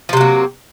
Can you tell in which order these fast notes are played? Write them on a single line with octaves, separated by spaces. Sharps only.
F3 C3 F#3 A#3